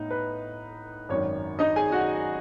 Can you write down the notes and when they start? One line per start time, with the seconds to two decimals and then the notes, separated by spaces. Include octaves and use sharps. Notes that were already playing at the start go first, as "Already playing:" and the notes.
Already playing: A2 B3 D#4
0.10 B4
1.09 G#1 F#2 D#3 C#5
1.59 D#4 D#5
1.76 G#4 G#5
1.92 F#4 F#5